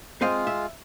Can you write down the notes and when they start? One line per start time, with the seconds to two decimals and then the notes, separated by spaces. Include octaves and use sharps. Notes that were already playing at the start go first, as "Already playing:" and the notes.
0.21 G#3 C4 F4 D#5 F5
0.47 E5